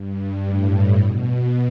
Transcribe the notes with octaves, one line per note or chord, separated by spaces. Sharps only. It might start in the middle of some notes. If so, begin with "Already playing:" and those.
Already playing: G2
A2
B2